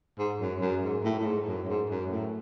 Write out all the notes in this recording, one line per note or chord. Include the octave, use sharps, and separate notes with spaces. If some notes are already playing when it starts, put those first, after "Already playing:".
G#2
F#2
F#2
G#2
A2
A2
G#2
F#2
G#2
F#2
A2